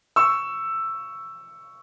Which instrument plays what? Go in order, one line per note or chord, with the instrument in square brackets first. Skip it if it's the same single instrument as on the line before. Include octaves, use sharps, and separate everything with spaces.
[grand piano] C#6 E6